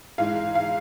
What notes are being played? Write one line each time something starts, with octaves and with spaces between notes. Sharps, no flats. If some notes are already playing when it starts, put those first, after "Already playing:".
G#2 E3 G#3 F5
F5